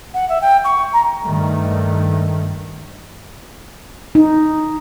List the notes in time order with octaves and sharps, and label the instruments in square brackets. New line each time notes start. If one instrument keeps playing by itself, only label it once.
[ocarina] F#5
E5
G5
C#6
A#5
[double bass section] G2 D#3 A3
[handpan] D#4